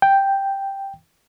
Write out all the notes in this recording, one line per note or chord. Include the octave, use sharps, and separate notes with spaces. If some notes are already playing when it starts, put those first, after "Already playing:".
G5